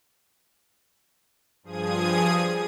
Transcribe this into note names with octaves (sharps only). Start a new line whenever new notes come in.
G2 F3 G#4 D#6 G#6 D#7